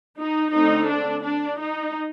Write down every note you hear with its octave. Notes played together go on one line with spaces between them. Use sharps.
D#4
D3 A3 C4 D#4
D4
D4
D#4